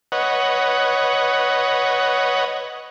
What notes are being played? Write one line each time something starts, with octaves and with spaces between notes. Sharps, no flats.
B4 C#5 D#5 F#5